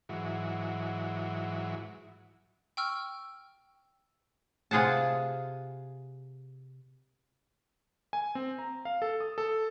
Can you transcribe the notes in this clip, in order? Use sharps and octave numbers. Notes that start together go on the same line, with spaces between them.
G#2 E3 F#3
G5 C#6 E6 F6
C3 F4 G#4 F#5 A5
G#5
C4
A#5
F5
A4
D#6
A4